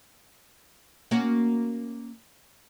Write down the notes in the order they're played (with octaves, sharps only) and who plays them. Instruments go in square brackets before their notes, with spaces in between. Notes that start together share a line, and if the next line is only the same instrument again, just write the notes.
[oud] A#3 C#4 F#4